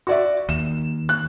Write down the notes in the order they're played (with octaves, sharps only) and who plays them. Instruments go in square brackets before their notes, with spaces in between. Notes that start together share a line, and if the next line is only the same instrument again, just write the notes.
[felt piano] F#4 D5 E5
[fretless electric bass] D#2 [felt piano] E7
[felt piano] F#6